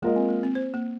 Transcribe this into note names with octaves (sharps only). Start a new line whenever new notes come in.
G#3 A#3 F4 A#4 D#5
C4
A#3
C4
C5
A#3